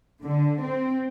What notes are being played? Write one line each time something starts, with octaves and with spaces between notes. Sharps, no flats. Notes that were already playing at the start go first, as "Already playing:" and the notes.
D3
C4